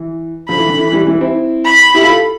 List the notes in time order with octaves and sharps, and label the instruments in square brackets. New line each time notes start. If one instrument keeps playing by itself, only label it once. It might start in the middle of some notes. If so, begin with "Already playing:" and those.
Already playing: [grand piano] E3
[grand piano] D3 F3 [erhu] B5
[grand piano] E3
D3
E3
E3 G3
E3 G3
C4 E4
[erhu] B5
[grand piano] E4 G4
F4 A4